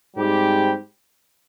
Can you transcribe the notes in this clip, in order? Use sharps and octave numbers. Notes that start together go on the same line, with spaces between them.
G#2 G3 C4 G4